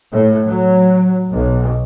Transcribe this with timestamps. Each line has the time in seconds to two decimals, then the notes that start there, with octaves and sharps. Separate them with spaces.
0.12 A2
0.46 F#3
1.32 B1